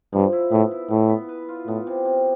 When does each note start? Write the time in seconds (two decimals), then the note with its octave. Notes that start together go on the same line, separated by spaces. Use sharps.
0.13 G2 F3
0.33 E4
0.51 A2 B3
0.71 E4
0.91 A2 B3
1.09 B3
1.29 B4
1.48 F4
1.67 A2 B3
1.87 C3
2.05 C3